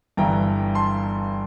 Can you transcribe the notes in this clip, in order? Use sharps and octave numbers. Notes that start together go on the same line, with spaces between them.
G1 G2 E3 G5 A#5
A5 C6